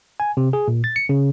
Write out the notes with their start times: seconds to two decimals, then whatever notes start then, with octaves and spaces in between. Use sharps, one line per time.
0.20 G#5
0.37 C3
0.53 G#4
0.68 A#2
0.84 A6
0.96 C#7
1.09 C#3